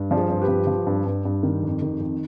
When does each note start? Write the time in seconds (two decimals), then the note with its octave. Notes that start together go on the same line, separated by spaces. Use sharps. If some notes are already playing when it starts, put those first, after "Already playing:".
Already playing: G2
0.11 F3 D5
0.16 G#4 C5
0.30 G2 C5
0.42 G4 B4
0.48 F3
0.67 F3
0.87 G2
1.06 G2
1.25 G2
1.43 D#3
1.63 F2
1.82 D#3
2.00 F2